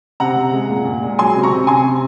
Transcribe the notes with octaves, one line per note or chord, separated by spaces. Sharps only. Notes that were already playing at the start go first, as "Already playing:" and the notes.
C3 F#5 A#5
C3
G#3
A#2
A#2
G#3
F#3 G#5 C6
C3
A#5 C#6
C3
C3 G#5 C6
C3